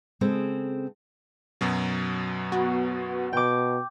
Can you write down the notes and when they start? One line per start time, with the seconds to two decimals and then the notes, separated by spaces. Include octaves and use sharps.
0.21 C#3 G#3 C4 A4
1.61 F#2 B2 F#3
2.52 B3 F#4
3.33 B2 G5 D6